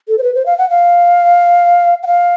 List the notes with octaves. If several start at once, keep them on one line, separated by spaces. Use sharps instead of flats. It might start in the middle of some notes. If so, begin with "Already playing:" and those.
A4
C5
B4
C5
F5
F#5
F5
F#5
F5